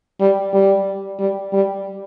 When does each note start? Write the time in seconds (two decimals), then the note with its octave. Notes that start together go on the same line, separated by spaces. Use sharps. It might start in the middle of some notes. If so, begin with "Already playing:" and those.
0.20 G3
0.53 G3
1.20 G3
1.53 G3